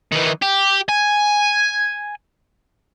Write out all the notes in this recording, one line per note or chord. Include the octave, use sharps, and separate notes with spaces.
D#3 E3
G4
G#5